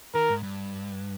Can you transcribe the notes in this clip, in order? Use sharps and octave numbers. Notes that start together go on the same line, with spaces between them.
D#3 A#4
G#2
G2